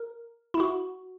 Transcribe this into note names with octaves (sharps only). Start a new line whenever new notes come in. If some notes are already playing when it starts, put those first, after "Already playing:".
Already playing: A#4
E4
F#4